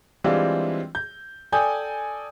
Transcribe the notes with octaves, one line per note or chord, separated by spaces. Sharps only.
E3 G3 G#3 C4 D4 F4
G6
A4 D5 G5 G#5 D#6 G6